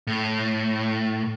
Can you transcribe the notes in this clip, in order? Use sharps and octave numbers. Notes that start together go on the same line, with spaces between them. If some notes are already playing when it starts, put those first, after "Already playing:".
A2